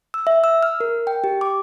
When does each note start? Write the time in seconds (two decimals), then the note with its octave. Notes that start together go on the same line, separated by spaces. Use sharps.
0.14 E6
0.27 E5
0.44 E6
0.63 F6
0.80 A#4
1.07 G5
1.24 G4
1.41 D6